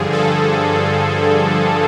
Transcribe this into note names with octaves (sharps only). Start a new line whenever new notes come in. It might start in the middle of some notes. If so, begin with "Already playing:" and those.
Already playing: G2 D3 F3 G#4
A4